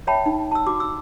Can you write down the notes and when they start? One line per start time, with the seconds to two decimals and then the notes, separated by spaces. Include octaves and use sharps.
0.07 C#5 E5 F#5 G5 A5 B5
0.26 D#4
0.52 A5 E6
0.67 F#4 D6
0.80 E6